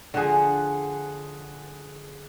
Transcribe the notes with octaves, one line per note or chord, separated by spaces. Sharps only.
D3 F3 G#4 F#5